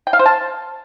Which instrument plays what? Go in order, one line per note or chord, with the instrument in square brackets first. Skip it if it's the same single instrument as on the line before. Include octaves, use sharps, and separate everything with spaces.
[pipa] G5
F5
C5
A5